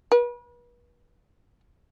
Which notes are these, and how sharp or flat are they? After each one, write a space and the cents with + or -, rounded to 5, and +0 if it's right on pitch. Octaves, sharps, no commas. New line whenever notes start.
B4 -35